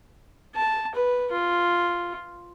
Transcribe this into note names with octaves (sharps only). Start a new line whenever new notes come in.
A5
B4
F4